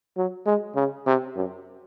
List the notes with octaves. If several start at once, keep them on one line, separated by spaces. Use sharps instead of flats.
F#3
G#3
C#3
C3
F#2